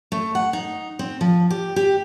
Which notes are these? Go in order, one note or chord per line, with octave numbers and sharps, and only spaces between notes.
A3
F#5
D#4
C4
F3
G4
G4